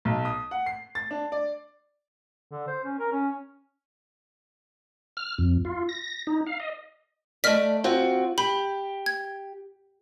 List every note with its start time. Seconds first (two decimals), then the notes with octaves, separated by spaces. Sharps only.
0.05 B1
0.25 D#6
0.51 F#5
0.66 C7
0.95 A6
1.11 D4
1.32 D5
2.51 D3
2.67 C5
2.84 C#4
2.99 A#4
3.12 C#4
5.17 F6
5.38 F2
5.65 F4
5.89 A#6
6.27 D#4
6.46 F5
6.60 D#5
7.44 A3 D5 D#5 F6 B6
7.84 C4 F4 F#4
8.38 G4 B5
9.06 G#6